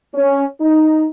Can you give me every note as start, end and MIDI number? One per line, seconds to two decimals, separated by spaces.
0.14 0.44 61
0.60 1.06 63